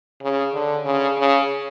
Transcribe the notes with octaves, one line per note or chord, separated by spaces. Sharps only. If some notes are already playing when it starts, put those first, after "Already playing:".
C#3
D3
C#3
C#3